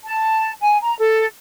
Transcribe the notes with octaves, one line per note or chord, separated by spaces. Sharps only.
A5
G#5
A#5
A4